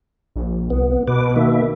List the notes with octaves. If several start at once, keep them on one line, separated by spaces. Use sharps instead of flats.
A#1
C2 B3
B2 B4 D6
D#3 A#3 E5